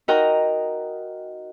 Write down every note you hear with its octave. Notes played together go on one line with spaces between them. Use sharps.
D#4 F#4 A#4 D#5 G5 A#5